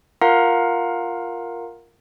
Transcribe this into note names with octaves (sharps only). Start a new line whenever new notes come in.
F4 A#4 F5 F#5 A#5